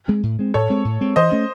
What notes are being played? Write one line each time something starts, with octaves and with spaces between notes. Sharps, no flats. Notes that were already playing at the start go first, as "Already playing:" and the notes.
G#3 C4
A2
G#3 C4
A2 A4 C#5
G#3 C4
A2
G#3 C4
E3 C5 D#5
A3 C#4